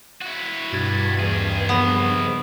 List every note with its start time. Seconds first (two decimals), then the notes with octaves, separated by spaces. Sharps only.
0.21 E4 F#4
0.73 G2 B2 G#6 A6
1.19 D#2 D#3 E3 G#4
1.69 C#3 F3 B3